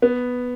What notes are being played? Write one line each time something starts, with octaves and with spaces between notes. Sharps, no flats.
B3